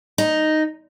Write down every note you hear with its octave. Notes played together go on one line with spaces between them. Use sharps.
D#4